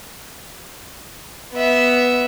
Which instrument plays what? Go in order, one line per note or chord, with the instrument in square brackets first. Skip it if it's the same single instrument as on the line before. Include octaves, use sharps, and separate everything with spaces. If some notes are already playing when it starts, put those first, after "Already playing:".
[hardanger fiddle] B3 E5